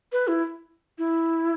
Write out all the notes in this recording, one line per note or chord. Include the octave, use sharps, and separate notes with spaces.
B4
E4
E4